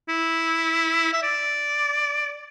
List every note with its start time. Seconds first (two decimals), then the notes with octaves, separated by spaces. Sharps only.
0.08 E4
1.13 E5
1.23 D5